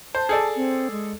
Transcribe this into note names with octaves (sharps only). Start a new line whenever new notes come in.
C5 A5
G#4 A4 D5
C4
G#3